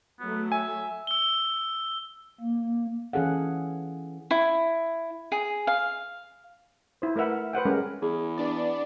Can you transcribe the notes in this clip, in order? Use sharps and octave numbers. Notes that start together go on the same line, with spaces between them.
F#3 A3 B3
E5 G#5
E6 G7
A#3
E3 C#4 G#4 A4 F5 F#5
E4
G#4
F5
E4 C5
A3 A#4 B4 E5 F#5
F#5
B4 C5 F#5 G5
G3 G#3 C#4 A#4
E2 G#4
B3 D4 D5